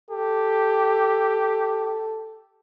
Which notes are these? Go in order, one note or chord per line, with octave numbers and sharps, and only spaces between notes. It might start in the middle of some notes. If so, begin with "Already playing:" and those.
G4 A4